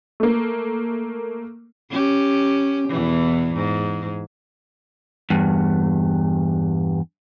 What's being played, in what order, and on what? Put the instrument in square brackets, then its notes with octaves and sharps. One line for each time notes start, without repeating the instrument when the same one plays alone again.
[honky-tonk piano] A3 A#3
[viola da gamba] C#4 G4
E2 B2 E3
G#2
[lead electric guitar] E2 G2